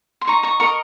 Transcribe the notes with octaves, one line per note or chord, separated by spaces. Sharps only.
C6
D#4 A#5 C#6
A#5 C#6
A#4 D#5 A#5 C#6